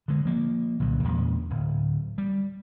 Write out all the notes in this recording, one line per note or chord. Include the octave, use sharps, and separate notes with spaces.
D3 G#3
F3 A#3
C2 A#2 D3 F#3
E2 A#2 G#3
D1
G3